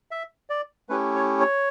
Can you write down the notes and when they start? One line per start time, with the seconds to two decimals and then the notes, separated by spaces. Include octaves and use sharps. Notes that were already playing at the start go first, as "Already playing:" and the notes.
0.11 E5
0.50 D5
0.89 A3 C#4 E4 G4 B4
1.15 C#5
1.41 C#5